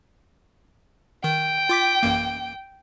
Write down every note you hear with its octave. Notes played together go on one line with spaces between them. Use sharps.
D#3 G5
F4 D6 B6
A1 F#2 A#3